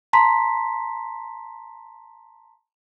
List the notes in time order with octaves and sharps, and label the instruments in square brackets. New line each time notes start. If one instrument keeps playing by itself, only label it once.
[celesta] A5 A#5 C6 B6